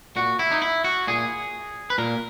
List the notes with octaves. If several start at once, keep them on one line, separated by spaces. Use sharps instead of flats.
A#2 F#4
E4
D#4
E4
F#4
A#2 G#4
B4
A#2 A#4